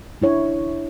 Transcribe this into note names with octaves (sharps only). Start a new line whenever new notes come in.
D4 E4 C#5